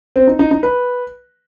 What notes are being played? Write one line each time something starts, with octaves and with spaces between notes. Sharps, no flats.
C4
D#4
D#4
D#4
B4